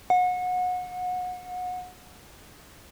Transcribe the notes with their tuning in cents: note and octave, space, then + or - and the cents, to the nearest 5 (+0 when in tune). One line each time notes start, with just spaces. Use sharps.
F#5 -30